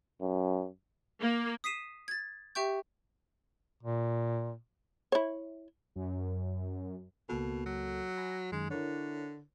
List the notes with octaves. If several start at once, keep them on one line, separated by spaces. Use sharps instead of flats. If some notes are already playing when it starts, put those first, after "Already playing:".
F#2
A#3
D#6 B6 C7 D#7 E7
G#6 A6
G4 E5 G5 C#6 G6
A#2
E4 C#5
F#2
C#2 B2 A#3 A4
F#3
G#5 B5 A#6
F#2 D#3 G#3
D3 E4 A#4 C#5